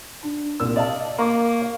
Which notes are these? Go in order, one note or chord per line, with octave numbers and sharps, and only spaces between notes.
D4
C2 A#2 E6
D5 D#5 F5 A5
A#3 A#5 C#6 D6
F5